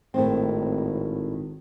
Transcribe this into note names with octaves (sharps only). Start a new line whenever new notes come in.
G#1 A2 D#3 C4